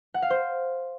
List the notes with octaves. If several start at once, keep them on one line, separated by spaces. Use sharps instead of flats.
F#5
F5
C5